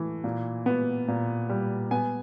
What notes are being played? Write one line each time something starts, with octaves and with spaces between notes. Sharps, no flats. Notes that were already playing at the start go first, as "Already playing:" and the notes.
Already playing: E3 A3
A#2
B3
A#2
G3
B3 G#5